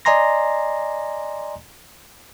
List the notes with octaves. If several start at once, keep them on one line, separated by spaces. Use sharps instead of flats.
D5 D#5 G#5 A#5 C6 A#6